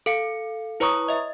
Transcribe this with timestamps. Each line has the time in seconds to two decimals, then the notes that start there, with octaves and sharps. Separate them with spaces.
0.06 A4 F5 C#7
0.80 E4 B4 C#5 A#5 C#6 D#6
1.08 D#5 E5